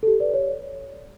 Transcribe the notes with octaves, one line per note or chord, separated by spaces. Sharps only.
A4
G4
B4 D5
C#5